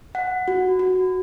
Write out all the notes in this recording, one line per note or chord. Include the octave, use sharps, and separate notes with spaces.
F#5
F#4
F#4